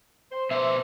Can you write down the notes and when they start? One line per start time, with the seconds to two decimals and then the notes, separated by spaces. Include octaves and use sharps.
0.32 C5
0.51 B2 C5 E5